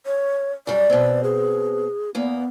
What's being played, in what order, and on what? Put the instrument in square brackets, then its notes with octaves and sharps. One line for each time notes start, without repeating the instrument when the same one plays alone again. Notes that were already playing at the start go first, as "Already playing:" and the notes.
[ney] C#5
[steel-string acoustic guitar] F#2 G3 [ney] D5
[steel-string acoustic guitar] B2 C4
[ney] G#4
[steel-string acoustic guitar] E2 A#3 [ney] B3